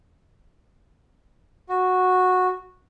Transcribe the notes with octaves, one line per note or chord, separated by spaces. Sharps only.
F#4